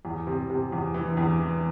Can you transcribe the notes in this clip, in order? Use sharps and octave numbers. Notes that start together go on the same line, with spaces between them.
E2
C3
C3
E2
E3
E2
E3